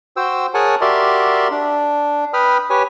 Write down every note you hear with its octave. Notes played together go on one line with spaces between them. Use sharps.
F#4 C5 G5 E6
G#4 A#4 C#5 F#5 G#5 A5
F#4 G4 A#4 D5 E5 C6
D4
B4 G5 B5 D#6 F6
G4 B4 C#5 G#5